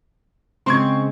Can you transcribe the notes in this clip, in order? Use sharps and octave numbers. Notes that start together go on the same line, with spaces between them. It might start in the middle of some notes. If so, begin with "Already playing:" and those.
C#3 G#3 C4 C6 C#6 G#6